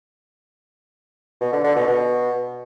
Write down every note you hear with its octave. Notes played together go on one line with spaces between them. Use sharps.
B2
D3
D3
B2
B2